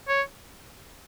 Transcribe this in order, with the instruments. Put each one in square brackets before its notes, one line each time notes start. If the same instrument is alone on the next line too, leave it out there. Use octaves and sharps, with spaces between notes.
[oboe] C#5